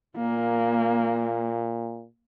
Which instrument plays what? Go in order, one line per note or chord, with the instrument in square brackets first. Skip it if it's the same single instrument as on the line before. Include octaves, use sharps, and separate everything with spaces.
[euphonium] A#2 [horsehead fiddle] A#3